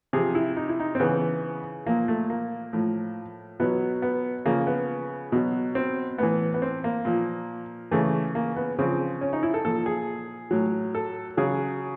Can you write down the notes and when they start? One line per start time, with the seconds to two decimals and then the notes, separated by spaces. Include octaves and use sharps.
0.13 C3 F3 G#4
0.35 E4
0.57 D#4
0.69 E4
0.80 D#4
0.95 C4
1.00 C#3 E3 B3
1.86 A#2 F3 A#3
2.08 A3
2.30 A#3
2.73 A2 F3
3.60 B2 F#3 B3
4.02 B3
4.46 C#3 F3 A#3
4.67 B3
5.32 B2 F#3
5.75 C4
6.18 A2 E3 B3
6.54 B3
6.62 C4
6.84 A#3
7.05 A#2 F3
7.91 C#3 E3 A3
8.35 A#3
8.56 B3
8.79 C#3 F3 C4
9.21 C#4
9.33 D#4
9.43 E4
9.54 A4
9.65 A#2 F3 A4
9.86 G#4
10.51 A2 F#3
10.95 A4
11.37 C#3 F#3 G#4